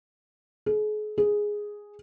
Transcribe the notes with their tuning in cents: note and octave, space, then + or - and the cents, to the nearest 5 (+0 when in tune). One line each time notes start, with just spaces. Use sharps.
G#4 +40
G#4 +0